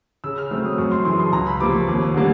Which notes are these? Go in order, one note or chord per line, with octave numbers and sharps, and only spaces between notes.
C#3 E6
F6
F#3 A3 C4 E6
D#6
F#2 C#6
C6
C#3 E3 C6
C6
A5
C#2 A#5
B5
C3 F3 A#3 D6
C#6
D#2
D3 G3 A#3